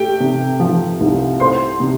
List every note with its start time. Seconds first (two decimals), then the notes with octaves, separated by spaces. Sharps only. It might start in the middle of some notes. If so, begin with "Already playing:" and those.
Already playing: A3 G4 G5
0.20 C3
0.60 F3
1.00 C2
1.40 A3 C5 C6
1.80 C3